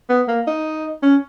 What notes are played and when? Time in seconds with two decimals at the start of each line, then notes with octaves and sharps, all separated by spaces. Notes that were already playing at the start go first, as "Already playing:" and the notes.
0.10 B3
0.28 A#3
0.47 D#4
1.03 C#4